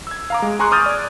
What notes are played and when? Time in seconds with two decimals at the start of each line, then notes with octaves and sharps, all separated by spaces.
0.07 E6 G#6
0.30 F5 A#5 D6
0.42 G#3
0.59 G#4 G#5 A#5 C6 C#6 F#6
0.71 D6 D#6 F6 G6 A6 D#7
0.86 D5 G#6